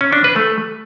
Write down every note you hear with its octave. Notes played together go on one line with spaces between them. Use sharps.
C#4
D4
B4
A3